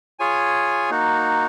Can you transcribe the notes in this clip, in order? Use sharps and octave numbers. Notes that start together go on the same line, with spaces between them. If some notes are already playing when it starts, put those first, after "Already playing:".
F4 G#4 C#5 G#5
A#3 D#4 F#4